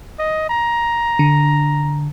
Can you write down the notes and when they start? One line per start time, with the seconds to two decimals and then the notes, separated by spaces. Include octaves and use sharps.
0.19 D#5
0.49 A#5
1.19 D3